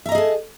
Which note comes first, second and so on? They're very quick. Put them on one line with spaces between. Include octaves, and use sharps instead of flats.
E5 A#5 D#5 G#4 A5